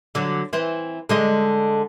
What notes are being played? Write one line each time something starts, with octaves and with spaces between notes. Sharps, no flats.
D3 F#3
E3 C4
D3 G#3 D#5